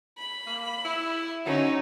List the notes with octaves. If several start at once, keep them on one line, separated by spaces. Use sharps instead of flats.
B5
A#3
E4
D3 F#3 C#4 D#4